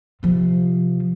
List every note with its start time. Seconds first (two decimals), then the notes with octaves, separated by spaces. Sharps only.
0.23 C3 F3